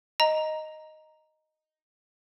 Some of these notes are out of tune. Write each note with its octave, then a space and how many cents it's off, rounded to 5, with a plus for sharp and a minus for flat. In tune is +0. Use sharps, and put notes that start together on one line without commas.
D#5 +0 A#5 +0